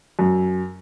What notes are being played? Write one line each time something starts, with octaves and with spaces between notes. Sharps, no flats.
F#2